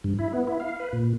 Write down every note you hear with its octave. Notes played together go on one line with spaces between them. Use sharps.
G2
E4
B3
E4
F5
B4
A#2